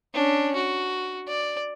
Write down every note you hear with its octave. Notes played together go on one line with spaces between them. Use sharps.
C#4 D4
F#4
D5